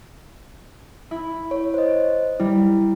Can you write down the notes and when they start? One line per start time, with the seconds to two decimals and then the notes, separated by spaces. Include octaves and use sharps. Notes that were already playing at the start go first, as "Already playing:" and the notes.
1.11 E4
1.51 C#5
1.74 C5 D#5
2.40 G3 E4